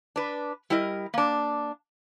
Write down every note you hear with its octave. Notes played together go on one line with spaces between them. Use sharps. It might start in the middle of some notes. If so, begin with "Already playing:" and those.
D4 B4
G3 E4 A#4 D#5
A#3 D4